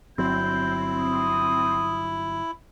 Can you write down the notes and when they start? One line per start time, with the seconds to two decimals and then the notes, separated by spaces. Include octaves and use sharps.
0.18 G1 F#3 C4 E4 G6
0.97 D#6